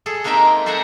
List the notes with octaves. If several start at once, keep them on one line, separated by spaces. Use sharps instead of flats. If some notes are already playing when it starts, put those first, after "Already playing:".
G#4 A4
G#3 A#3 C4 D#4 E5 G5
A4 C5 E5 F#5 G#5 A#5